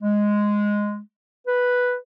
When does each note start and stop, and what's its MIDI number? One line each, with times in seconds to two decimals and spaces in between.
0.02 1.01 56
1.48 1.96 71